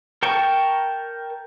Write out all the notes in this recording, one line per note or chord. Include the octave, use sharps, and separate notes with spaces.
A#4 G5 A5 C#6